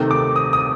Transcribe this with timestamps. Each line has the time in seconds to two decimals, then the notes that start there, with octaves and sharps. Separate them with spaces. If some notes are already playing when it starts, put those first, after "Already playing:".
Already playing: C3 D#3 A3
0.11 D6
0.36 D#6
0.53 D#6